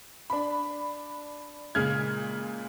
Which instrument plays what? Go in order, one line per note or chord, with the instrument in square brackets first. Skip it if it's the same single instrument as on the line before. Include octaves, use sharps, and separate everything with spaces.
[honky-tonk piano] D4 B5
A#2 C#3 G#3 F6 G#6